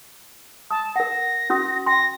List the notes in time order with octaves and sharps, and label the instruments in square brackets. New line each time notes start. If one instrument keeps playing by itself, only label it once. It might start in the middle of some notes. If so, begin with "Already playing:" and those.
[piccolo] A5 [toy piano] D#6
[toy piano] A#4 F#5 [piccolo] A#6
[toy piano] C#4 F#4 D#6
[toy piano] G5 C6 [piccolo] A#6